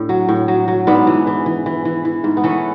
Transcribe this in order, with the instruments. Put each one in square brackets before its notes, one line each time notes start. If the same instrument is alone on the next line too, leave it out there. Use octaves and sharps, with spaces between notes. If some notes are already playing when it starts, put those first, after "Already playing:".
Already playing: [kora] A2 D4
F#3
A2
F#3
F#3
G#2 B3 D4
E3
E3
E3
E3
E3
E3
G#2
B3
E3 A3 C#4